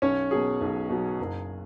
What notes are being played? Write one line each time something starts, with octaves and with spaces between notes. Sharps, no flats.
B1 C#4 C#5
B2 F#3 G#4
B1
B2 F#3
F#1